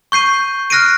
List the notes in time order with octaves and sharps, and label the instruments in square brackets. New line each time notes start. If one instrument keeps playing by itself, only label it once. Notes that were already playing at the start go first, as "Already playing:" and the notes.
[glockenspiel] C#6 G6 C7 D#7
F6 F#6 A#6 C7 D7 D#7